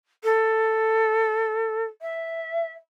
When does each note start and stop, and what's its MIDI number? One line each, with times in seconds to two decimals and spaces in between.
0.23 1.83 69
2.01 2.72 76